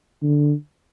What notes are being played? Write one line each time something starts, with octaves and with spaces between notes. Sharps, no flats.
D3